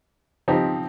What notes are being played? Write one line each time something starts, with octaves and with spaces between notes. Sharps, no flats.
F3 C4 D#4 G4